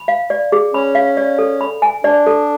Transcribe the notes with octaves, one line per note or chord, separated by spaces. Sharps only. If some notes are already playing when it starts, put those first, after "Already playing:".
Already playing: B5
F5
D5
G#4
C#4 B5
F5
D5
A4
B5
G#5
D4 D5
A4